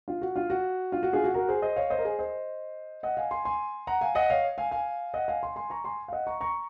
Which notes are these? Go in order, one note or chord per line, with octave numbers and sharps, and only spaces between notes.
F4
F#4
F4
F#4
F4
F#4
F4 G#4
F#4
F#4 A#4
G#4 C5
C5 D#5
C#5 F5
C5 D#5
A#4
G#4 C5
C5 D#5
D#5 F#5
F5 G#5
G#5 C6
G#5 C6
F#5 A#5
F5 G#5
D#5 F#5
C#5 F5
F5 G#5
F5 G#5
D#5 F#5
F5 G#5
G#5 C6
G#5 C6
A#5 C#6
G#5 C6
F5
D#5 F#5
A#5 C#6
A#5 C#6